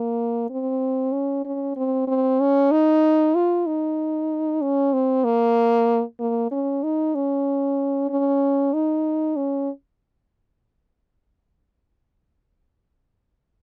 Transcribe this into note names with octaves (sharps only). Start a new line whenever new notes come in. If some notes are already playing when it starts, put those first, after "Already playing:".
Already playing: A#3
C4
C#4
C#4
C4
C4
C#4
D#4
F4
D#4
C#4
C4
A#3
A#3
C#4
D#4
C#4
C#4
D#4
C#4